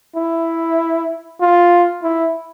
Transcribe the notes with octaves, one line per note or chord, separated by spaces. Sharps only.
E4
F4
E4